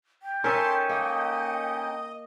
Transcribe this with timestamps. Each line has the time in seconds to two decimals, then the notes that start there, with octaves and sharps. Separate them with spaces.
0.23 G5
0.44 C#4 D#4 A4 A#4 E5 A5 C6
0.89 A#3 D#5